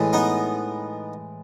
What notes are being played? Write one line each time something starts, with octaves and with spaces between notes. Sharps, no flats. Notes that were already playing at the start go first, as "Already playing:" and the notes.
Already playing: A2 E3 G#3
B3 D#4